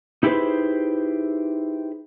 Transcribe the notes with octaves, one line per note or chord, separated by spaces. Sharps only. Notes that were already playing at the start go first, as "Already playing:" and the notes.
D#4 E4 G4 G#4 B4 C5